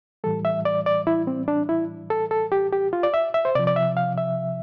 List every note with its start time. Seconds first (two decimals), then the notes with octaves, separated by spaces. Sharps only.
0.24 A2 E3 G3 A4
0.45 E5
0.65 D5
0.86 D5
1.07 E4
1.27 C4
1.48 D4
1.69 E4
2.10 A4
2.31 A4
2.52 G4
2.73 G4
2.93 F4
3.03 D5
3.14 E5
3.34 E5
3.45 C5
3.55 C3 D5
3.59 F3
3.67 D5
3.76 E5
3.97 F5
4.18 E5